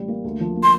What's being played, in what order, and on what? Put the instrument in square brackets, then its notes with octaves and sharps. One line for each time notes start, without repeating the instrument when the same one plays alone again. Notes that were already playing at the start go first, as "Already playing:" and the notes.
Already playing: [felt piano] A1 G3
A#3
D2
F3
A#3
[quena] C6